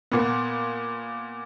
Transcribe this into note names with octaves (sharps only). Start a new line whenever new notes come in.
A#2 B3